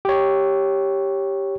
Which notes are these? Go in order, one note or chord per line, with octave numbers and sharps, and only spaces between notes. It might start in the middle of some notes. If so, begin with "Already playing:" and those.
G4 C#5